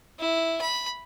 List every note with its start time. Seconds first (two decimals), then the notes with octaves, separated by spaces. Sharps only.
0.19 E4
0.61 B5